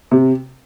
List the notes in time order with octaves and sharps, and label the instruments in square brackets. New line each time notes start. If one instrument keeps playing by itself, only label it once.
[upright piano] C3